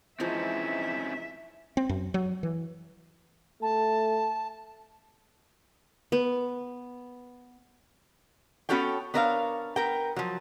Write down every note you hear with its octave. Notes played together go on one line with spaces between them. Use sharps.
E3 F3 G#3 C4 C#4 D#4 E5
C4
F#2
F#3
E3
A3 A5
B3
B3 C#4 F#4 A4 C#5 G5
B3 D4 A#4 C#5 E5 F5
B3 A#4 G5
F3 F#3